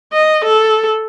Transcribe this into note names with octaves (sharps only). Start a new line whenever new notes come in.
D#5
A4